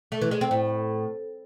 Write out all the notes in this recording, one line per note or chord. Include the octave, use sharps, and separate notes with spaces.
A3
E3
G#3
C4
A2